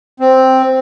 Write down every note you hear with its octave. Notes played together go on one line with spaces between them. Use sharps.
C4